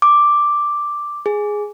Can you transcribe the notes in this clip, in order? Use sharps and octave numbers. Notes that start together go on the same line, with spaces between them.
D6
G#4